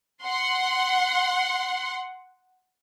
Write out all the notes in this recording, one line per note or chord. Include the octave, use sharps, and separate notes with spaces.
F#5 C6